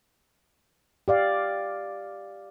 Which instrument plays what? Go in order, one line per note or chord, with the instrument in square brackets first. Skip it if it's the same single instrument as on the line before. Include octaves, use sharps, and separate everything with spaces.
[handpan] G4 D5 F5